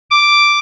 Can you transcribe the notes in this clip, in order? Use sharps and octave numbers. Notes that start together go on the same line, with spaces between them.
D6